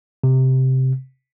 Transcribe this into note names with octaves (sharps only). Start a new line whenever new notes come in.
C3